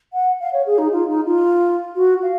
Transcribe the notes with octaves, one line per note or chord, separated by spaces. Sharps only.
F#5
F5
C#5
G#4
D#4
F4
D#4
F4
F#4
F5